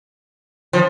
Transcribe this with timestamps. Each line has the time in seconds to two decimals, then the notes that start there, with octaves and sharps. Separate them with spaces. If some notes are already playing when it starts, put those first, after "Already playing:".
0.73 F3